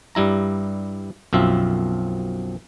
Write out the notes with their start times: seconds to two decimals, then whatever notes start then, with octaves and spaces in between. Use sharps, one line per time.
0.15 G2 G3 E4 A#5
1.33 B1 F#2 F3 C4 E5